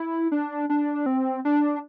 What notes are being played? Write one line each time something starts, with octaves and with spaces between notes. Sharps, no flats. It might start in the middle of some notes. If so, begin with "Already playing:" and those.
Already playing: E4
D4
D4
C4
D4